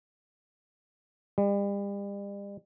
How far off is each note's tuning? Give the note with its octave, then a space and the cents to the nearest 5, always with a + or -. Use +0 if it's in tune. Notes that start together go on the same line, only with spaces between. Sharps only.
G3 +40